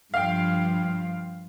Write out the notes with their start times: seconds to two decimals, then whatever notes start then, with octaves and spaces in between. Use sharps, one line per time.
0.14 G2 F3 F5 G5